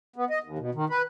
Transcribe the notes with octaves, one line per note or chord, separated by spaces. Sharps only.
B3
D#5
D#2
B2
D#3
B4